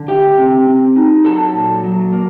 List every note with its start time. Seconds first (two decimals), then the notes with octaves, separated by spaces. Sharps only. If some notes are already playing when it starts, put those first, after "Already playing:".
Already playing: D3
0.08 A3 G4 G5
0.38 C4
0.67 C4
0.96 D#4
1.25 F#3 A4 A5
1.54 A#2
1.83 F#3
2.13 A#3